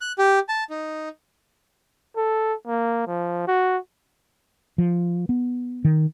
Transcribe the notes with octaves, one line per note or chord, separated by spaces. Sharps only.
F#6
G4
A5
D#4
A4
A#3
F3
F#4
F3
B3
D#3